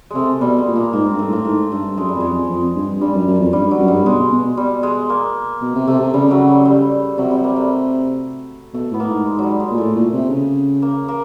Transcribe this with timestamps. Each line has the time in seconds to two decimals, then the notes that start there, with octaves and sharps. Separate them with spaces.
0.11 C3 G#3 A3
0.41 B2 G3
0.58 G#3
0.68 A#2
0.76 A#3
0.93 G#2 A#3
1.06 G2 C4
1.19 A3
1.28 A2 A#3
1.45 G#2 A3
1.71 G2 A3
1.97 F#2 G#3
2.09 G3
2.15 F2
2.20 G#3
2.33 F2
2.50 F2
2.76 G2
3.01 G2 G3
3.14 F#2
3.27 F#2
3.40 F2
3.53 G2 G3
3.66 G2
3.71 F#3
3.80 F#2
3.88 G2 G3
4.06 B2 G#3
4.19 B2
4.32 B2
4.44 B2
4.57 G3
4.83 G#3
5.10 A#3
5.61 B2
5.75 C3
5.88 C3 A3
6.00 C3
6.13 C#3 G3
6.31 F#3
6.48 G3
6.65 G3
7.18 C3 F#3
7.31 G3
7.44 A#3
7.56 A3
8.74 B2 A3
8.91 A2 B3
9.00 A#3
9.09 G#2
9.26 G#3
9.39 F#3 G3
9.60 G#3
9.71 A#2
9.78 A2 A3
9.95 A#2
10.13 C3
10.30 C#3
10.82 A#3
11.08 A#3